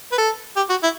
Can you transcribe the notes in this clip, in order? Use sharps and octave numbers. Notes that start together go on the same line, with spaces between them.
B4
A4
G4
F#4
E4